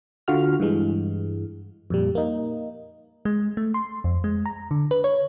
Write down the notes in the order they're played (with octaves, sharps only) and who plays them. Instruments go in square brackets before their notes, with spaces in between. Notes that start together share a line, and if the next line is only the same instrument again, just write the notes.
[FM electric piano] D3 F4 F#4 F6
G2 E3 G#3
F2 A#2 G3
A#3 D#4
G#3
A3
C6
F2
G#3
A#5
D3
B4
C#5